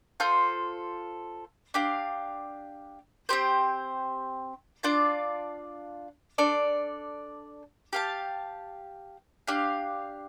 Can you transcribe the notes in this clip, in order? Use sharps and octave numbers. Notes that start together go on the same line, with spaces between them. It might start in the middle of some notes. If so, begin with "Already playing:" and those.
F4 A4 C5
D4 G4 F5
C4 G4 C5
D4 F4 D5 A5
D4 A4 D5
G4 F5 A5
D4 G4 F5